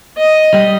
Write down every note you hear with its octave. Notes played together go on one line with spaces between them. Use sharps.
D#5
G3